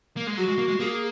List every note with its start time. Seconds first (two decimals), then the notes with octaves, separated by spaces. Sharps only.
0.17 A#3
0.27 G#3
0.37 F#3 F#4
0.48 G#3
0.58 A#3
0.68 G#3
0.79 A#3 G#4